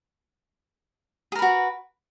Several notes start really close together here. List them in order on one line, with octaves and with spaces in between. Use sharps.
G#4 A#4 B4 F#4